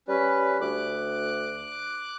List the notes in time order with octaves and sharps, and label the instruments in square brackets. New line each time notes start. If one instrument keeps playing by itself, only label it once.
[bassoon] G3 [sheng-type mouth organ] C#4 B4
[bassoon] D2 [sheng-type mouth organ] D6 F#6